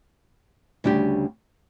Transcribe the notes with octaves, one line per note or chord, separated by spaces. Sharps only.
D2 C#3 G3 D4 G4